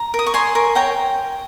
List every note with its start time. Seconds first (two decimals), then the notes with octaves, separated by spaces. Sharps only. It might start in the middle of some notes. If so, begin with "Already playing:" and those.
Already playing: A#5
0.14 A#4
0.19 D#6
0.27 C#6
0.34 C#5 G#5 C6
0.55 A#4
0.75 C#5 G5 A#5